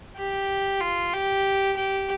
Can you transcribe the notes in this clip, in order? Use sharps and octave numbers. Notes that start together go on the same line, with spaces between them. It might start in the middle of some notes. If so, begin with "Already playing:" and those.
G4
F4
G4
G4